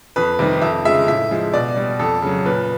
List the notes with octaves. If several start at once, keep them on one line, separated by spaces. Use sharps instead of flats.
F2 B4
C3 D#3 G3
F2 E5
C#3 F3 G#3 E5
A2 E5
F3 G#3
B2 D5
G3
F2 A4
C#3 F#3
A#2 B4